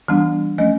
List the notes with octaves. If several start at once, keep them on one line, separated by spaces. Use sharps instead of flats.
E3 G3 B3 D4
F3 A3 C#4 D#5